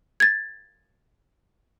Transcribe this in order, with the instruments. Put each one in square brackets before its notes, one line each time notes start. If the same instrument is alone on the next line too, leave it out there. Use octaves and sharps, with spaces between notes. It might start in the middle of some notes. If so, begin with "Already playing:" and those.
[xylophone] G#6 A6